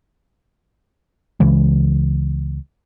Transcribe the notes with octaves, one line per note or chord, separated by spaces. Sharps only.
C#2 C#3 E3 G#3